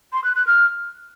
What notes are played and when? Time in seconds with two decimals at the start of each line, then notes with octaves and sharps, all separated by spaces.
0.13 C6
0.24 F#6
0.35 F#6
0.47 F6